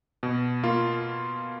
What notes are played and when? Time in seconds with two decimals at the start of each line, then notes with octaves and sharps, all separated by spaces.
0.23 B2
0.63 A#3 F4